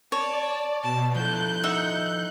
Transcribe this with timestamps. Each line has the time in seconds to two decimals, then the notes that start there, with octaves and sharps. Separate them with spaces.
0.12 C#5 D5 A5
0.83 B2 A5
1.16 F3 E4 A4 F#6 G6
1.63 D#4 E5 F#5